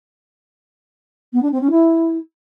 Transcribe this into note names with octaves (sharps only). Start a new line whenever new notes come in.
B3
D4
C4
C#4
E4